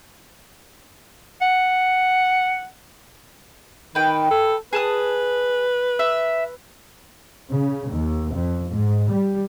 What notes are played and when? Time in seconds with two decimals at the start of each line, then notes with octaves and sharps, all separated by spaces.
1.41 F#5
3.95 D#3 B4 G5
4.31 A4
4.73 G#4 B4 A5 D#6
5.99 E5
7.49 C#3
7.91 D#2
8.35 F2
8.71 G#2
9.12 G3